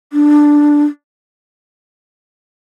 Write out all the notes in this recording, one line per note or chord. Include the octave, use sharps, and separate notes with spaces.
D4